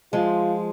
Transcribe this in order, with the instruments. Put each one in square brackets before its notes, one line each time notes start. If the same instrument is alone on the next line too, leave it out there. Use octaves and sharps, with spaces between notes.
[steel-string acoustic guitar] F3 G#3 [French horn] F4